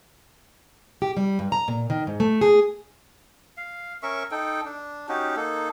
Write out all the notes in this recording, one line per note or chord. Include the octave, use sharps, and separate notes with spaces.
G4
G3
G2
A#5
A#2
D#3
G#2
A3
G#4
F5
C#4 A#4 E5 C#6
D#4 A4 G5
D4
C#4 D#4 F#4 G4
A#3 D#4 A4